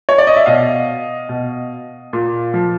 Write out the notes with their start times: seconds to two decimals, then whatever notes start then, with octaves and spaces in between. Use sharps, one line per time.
0.09 C#5
0.18 D5
0.27 D#5
0.36 E5
0.46 B2 D#5 F5
1.29 B2
2.13 A#2
2.54 F3